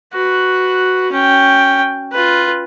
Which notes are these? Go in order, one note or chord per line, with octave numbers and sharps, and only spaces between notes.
F#4 B4
C#4 G5
F4 B4